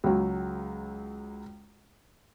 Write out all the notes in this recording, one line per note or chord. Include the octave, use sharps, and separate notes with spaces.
C#2 F#3